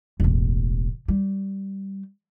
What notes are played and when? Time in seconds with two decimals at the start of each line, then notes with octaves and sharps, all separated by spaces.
0.20 E1 A1
1.08 G3